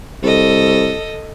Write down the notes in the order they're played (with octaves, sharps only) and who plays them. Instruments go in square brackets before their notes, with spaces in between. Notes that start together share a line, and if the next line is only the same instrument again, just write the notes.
[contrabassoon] C2 [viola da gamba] A4 D#5